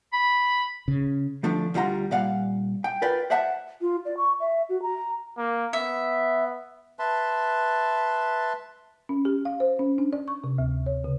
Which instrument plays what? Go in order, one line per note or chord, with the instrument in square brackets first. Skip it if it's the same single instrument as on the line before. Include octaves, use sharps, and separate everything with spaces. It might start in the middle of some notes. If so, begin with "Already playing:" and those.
[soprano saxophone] B5
[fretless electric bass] C#3
[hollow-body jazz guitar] D3 F3 A3 D4
D2 G3 F4 F#5 A#5 C6
A#2 G3 D5 F5 F#5
G5
F4 A#4 B4 D5 G5
C5 D5 E5 F#5 A5
[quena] F4
D5
C#6
E5
F#4
A#5
[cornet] A#3
[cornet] B3 [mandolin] E5
[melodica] B4 E5 A5 C6
[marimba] C#4
G4
F5
C5
C#4
D4
D5
C#6
C3
D2
C#5
C#3